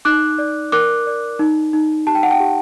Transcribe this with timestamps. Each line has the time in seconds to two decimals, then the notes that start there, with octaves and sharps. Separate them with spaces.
0.05 D#4 D6 F#6
0.38 D5
0.72 A#4 D6 F#6
1.07 D5
1.39 D#4
1.73 D#4
2.07 G4 A5
2.15 G5
2.23 F#5
2.31 G5
2.40 G4